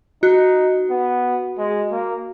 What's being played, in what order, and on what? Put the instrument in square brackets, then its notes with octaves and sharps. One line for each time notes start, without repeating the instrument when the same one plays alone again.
[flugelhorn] D#4 [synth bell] F#4
[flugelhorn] B3
G#3
A#3